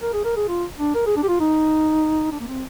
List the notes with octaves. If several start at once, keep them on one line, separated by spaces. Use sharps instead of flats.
A#4
G#4
A#4
G#4
F4
D4
A#4
G#4
D4
G4
F4
D#4
D4
A#3
C4